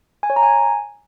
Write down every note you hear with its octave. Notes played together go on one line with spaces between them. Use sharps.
G#5
C#5
A#5
G#5